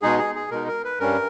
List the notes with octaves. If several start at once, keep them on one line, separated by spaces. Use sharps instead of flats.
B2 G#3 D#4 G#4
G#4
G#4
B2 G#3 D#4 A#4
A#4
B4
G2 G3 C#4 A#4